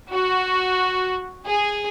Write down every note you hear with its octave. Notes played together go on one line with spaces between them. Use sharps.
F#4
G#4